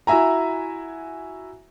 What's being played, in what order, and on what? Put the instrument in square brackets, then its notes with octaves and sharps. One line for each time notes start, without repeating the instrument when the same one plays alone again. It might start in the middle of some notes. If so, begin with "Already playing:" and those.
[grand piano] E4 F#4 E5 G#5 A#5